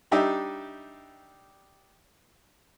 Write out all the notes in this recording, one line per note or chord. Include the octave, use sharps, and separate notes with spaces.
G3 D4 D#4 G4 D#5 E5